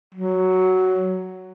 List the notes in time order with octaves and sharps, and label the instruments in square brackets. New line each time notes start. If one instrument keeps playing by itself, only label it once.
[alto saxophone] F#3